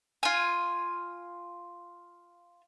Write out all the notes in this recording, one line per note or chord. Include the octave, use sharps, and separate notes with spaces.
F4 G#5